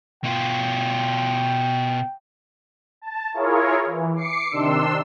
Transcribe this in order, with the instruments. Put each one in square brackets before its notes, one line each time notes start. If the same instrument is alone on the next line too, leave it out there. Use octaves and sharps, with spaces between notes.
[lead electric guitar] B2 F4 [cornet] G5
[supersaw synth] A5
E4 F4 G#4 A#4 C#5
E3
D6 C7 C#7
C3 D#3 D4 C6 E6